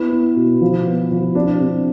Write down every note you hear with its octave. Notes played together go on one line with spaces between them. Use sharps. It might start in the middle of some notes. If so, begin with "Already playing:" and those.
Already playing: B3 E4
B3
B2
F3
B3
F3
C3 D4
C3